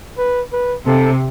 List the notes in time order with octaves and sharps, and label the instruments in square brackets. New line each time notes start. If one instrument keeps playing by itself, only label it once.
[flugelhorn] B4
B4
[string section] C3 [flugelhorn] A4